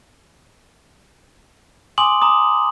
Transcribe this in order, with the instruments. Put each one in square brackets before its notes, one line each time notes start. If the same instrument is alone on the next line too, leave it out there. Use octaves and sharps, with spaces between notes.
[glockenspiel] G#5 C6 D6 D#6 F#7
A#5 D6 D#6